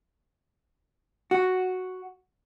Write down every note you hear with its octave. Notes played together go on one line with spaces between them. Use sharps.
F#4